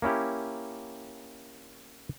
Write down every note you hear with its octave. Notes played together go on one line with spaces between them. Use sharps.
A#3 C#4 E4 G4